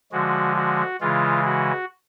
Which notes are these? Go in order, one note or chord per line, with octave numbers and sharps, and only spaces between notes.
D3 F3 G#3 F#4
F#4
C#3 E3 G#3 F4
F#4